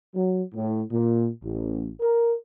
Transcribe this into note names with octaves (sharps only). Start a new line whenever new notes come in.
F#3
A2
A#2
A1
A#4